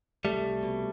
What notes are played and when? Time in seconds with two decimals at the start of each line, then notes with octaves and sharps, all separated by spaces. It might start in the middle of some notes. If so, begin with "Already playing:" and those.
0.25 C2 G3 A3
0.44 C2
0.63 B2